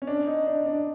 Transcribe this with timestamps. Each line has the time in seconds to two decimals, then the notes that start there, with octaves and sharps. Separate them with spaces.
0.02 C#4
0.07 D4
0.27 D#4
0.47 D4
0.66 D4